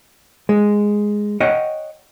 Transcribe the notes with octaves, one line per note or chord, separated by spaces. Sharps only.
G#3
C#5 D#5 F#5 G5